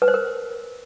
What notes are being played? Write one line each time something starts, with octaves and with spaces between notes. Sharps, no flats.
B4
C5
A#4